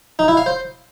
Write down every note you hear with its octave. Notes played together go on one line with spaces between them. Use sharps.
D#4
E4
F5
C5